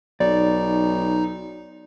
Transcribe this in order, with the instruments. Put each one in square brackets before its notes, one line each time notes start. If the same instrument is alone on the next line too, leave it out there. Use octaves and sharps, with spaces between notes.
[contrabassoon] B1 [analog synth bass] D#4 [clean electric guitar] D5